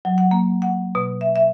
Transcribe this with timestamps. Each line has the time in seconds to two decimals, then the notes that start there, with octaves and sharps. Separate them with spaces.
0.05 F#3
0.18 F#5
0.31 A#3
0.62 F#5
0.95 B2
1.21 E5
1.36 E5